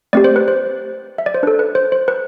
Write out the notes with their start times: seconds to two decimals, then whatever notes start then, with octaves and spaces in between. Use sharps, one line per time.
0.13 A3 C4 G4 D5
0.24 C5
0.36 B4
0.48 C5
1.18 E5
1.26 D5
1.34 C5
1.43 D4 A4 B4
1.59 B4
1.75 C5
1.92 C5
2.08 B4